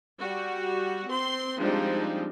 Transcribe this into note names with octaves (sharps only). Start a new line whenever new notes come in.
G3 F#4
C4 C6
F3 G3 G#3 C4 D4 D#4